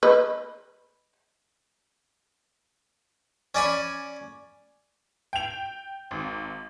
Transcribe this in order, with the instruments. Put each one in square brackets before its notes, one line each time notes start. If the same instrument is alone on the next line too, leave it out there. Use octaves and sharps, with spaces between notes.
[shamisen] B4 D#5
[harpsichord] C#4 D5 G#5 B5
[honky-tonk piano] G5 F7
G#1